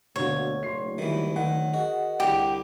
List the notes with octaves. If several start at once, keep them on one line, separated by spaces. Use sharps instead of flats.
D2 B2 D3 A#3 C#5
F#1 D2 C6 C7
D#3 E3 G3
D#3 F#5
F#4 G#4 A#4 D#5
C2 D3 G4